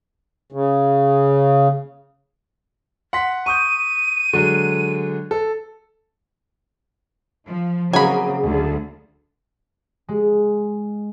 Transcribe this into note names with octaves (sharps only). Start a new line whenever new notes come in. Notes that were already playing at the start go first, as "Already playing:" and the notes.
C#3
F#5 C6 B6
C#6 D#6 G6 D#7
D3 F#3 G#3
A4
F3
C#3 F#3 A#3 C4 G#4 D#5 G#5 B5
D2
G#3